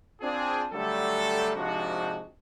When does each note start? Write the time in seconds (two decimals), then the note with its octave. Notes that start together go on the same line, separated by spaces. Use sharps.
0.21 C4 D4 F4 G#4
0.73 D3 F#3 G3 A3 G4 A4
1.56 G#2 C3 F3 G#3 D4 F#4